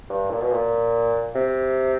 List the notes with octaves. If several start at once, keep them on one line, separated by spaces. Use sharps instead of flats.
G2
A#2
B2
A#2
C3